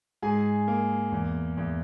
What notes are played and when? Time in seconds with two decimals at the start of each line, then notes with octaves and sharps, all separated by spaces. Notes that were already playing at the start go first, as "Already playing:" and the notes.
0.22 G#2 G#4 G#5
0.68 A#3
1.12 E2
1.57 E2